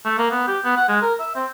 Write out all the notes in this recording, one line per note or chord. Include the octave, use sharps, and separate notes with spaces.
A3
A#3
B3
G4
B3
F#5
G#3
A#4
E5
C4